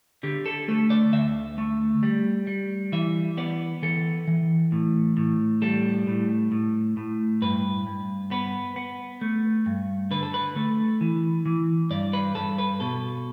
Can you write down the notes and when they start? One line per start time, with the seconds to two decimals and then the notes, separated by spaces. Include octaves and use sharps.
0.23 D3 G4
0.46 A4
0.68 A3 A4
0.90 D5
1.13 D2 E5
1.58 A3
2.03 G3
2.47 G3
2.92 E3 E5
3.37 B3 D5
3.82 E3 A4
4.28 E3
4.72 A2
5.17 A2
5.62 G3 A4
6.07 A2
6.52 A2
6.97 A2
7.42 G2 B4
7.87 G2
8.31 B3 B4
8.76 B3
9.21 A3
9.66 G2
10.11 D3 B4
10.23 A4
10.34 B4
10.56 A3
11.01 E3
11.46 E3
11.90 G2 D5
12.13 B4
12.35 G2 A4
12.58 B4
12.80 B2 A4